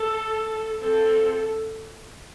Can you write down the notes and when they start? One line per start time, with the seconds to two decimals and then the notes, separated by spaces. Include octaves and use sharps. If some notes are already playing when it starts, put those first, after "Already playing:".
Already playing: A4
0.82 F3 C4 A4